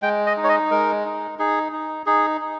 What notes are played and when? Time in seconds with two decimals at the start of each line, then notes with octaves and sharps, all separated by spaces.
0.03 G#3 G5
0.26 D#5
0.37 D#4
0.44 C#5
0.49 D#5
0.71 G#3 A#4
1.05 D#4
1.39 D#4 G#4
1.72 D#4
2.06 D#4 G#4
2.41 D#4